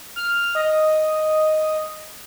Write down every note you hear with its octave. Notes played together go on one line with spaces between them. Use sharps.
F6
D#5